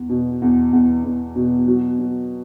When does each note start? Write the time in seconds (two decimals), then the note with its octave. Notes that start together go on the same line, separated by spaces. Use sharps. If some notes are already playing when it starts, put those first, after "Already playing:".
Already playing: E2
0.09 B2
0.42 E2
0.73 E2
1.04 E2
1.36 B2
1.67 F#3
1.99 F#3